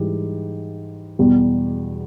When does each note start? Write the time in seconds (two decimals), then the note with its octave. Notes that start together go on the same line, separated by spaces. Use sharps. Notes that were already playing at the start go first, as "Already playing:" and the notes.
Already playing: G#2 E3 G3 G4
1.19 E2 B2 G3